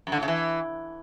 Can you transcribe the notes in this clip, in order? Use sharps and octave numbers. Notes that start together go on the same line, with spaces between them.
F#2
D3
A2
C#3
E3